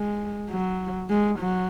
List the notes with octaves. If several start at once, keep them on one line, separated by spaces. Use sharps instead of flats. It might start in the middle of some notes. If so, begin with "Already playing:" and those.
Already playing: G#3
F#3
G#3
F#3